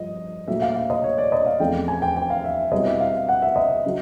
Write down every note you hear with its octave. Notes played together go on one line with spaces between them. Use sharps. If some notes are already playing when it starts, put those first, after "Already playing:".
Already playing: G2 F3 D#5
A#2 F#3 A3 E5
F5
F5
D#5
C#5
D5
D#5
F5
E2 C3 F3 A3 C#4 G5
G#5
G5
G5
F5
E5
C2 B2 F#3 B3 E4 D#5
E5
F5
F#5
E5
D#5
C#3 F#3